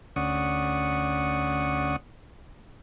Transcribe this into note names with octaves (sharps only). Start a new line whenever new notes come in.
D2 C#4 D5 F#5 C#6 D#6